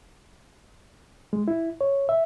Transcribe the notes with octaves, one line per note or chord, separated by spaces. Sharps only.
G#3
E4
C#5
E5